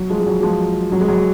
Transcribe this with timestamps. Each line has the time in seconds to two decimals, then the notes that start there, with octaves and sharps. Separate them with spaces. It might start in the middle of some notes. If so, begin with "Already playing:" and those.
Already playing: F#3
0.10 F3 G#3
0.20 G#3
0.26 F#3
0.42 F3 G#3
0.92 F#3
1.01 G#3
1.08 F#3